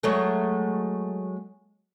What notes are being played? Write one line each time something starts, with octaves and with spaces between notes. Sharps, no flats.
F#3 G#3 A3